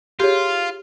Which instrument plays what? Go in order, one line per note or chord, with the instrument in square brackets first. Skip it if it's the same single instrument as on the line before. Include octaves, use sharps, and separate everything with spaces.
[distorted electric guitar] F4 [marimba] G4 G#4 C#5